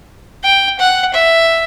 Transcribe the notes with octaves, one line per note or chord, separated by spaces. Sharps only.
G5
F#5
E5